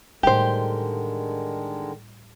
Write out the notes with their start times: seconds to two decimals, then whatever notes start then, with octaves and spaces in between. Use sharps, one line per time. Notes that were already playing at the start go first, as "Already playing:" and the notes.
0.23 A2 D3 D#3 G3 G#3 G4 C5